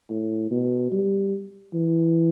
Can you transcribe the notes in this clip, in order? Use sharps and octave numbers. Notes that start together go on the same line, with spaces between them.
A2
B2
G3
E3